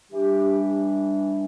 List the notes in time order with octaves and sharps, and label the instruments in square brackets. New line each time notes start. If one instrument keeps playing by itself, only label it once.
[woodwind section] E3 G3 D4 G4